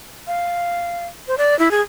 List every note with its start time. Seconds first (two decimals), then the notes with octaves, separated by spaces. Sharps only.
0.27 F5
1.28 C5
1.38 D5
1.59 E4
1.71 G#4